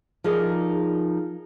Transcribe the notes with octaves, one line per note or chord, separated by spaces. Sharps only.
F3 D#4 G#4 A#4 D5